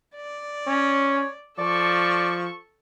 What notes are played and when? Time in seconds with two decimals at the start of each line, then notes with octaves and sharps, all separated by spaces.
0.16 D5
0.67 C#4 C#5
1.59 F3 A4 D5 C#6